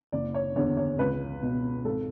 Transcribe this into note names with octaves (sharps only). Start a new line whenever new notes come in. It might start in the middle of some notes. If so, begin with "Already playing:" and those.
F#1 D5
C#5
E2 D3 C#5
C#5
C#2 B4
B2
G#1 A4